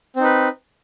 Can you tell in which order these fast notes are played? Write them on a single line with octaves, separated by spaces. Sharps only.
C4 D#4 B4